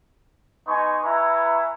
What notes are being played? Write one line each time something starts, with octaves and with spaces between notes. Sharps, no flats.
B3 D#4 G#5 C6 C#6
E4 B4 E5 G#5 A#5 C#6